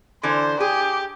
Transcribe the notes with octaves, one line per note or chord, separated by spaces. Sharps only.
D3 E3 C5
G4 G#4